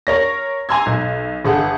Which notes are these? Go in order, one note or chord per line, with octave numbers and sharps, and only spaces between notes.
A#4 C#5 A#6
G#5 A#5 C6 E6 G#6
B1
G1 G#4 A4 F#5